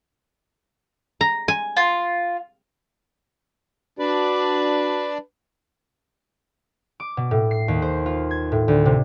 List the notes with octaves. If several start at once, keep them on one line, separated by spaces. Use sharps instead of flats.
A#5
G#5
F4
D4 F#4 B4 D5
D6
B2
A2
C7
D#2
C5
F4
G#6
A2
D2
C3